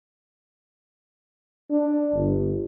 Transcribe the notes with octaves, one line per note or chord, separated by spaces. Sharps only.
D4
G1